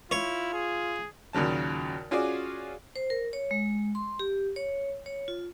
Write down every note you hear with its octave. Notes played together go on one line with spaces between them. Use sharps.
E4 F4 C#5
G#4
D#2 A#2 C#3 F#3 A5
C#4 F4 F#4 G#4 D5
C5
A#4
C#5
G#3
C6
G4
C#5
C#5
F4